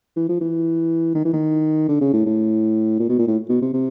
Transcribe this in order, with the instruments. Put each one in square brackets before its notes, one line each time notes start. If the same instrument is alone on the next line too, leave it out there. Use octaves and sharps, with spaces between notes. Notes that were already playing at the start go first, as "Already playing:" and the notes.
[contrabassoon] E3
F3
E3
D#3
E3
D#3
D3
C#3
A2
A2
A#2
B2
A#2
A2
B2
C3
C3